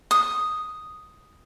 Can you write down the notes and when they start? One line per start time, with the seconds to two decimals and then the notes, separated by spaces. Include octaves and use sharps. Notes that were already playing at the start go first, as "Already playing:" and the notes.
0.11 D#6